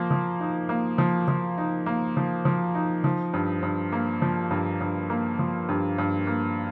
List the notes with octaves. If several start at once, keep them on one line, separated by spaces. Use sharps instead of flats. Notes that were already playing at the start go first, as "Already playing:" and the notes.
Already playing: F3 A#3
F3
D#4
A#3
F3
F3
D#4
A#3
F3
F3
D#4
F3
G2
G2
A#3
F3
G2
G2
A#3
F3
G2
G2
A#3